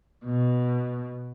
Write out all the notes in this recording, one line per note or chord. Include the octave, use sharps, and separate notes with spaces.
B2